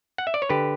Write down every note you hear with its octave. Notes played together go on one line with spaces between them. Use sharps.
F#5
E5
D5
C#5
D3 G4 B4